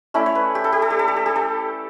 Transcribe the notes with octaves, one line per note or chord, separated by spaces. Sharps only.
A3 C#4 E4 D5
C#5
B4
G4
A4
G4
A4
G4
A4
G4
A4
G4
A4